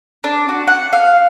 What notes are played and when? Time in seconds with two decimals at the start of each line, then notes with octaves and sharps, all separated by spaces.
0.24 D4
0.49 F#4
0.67 F#5
0.93 F5